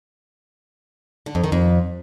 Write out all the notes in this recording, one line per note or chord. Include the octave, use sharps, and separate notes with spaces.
D3
F2
D#3
F2